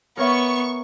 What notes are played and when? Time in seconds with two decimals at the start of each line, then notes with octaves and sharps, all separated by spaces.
0.17 B3 A#4 C#5 E5 C#6